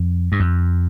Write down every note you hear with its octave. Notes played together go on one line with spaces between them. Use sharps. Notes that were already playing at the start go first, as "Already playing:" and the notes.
Already playing: F2
G2
F2